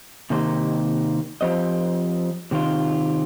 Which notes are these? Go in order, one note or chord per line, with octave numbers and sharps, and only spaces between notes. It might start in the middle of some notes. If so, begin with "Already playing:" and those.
C3 D#3 A#3 G4 C5
F3 C4 G4 C5 D#5
C3 D#3 C4 F4